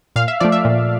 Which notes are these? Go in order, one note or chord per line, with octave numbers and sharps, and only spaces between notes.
A#2 F5
E5
F3 A3 D5
E5
A#2